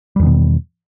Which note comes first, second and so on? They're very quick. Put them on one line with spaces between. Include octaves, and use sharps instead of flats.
G3 E2 D#3 B2